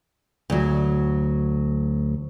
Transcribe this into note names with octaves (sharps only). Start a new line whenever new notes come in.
D2 F#3